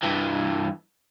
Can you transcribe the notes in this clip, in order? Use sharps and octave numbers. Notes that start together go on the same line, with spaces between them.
G2 E3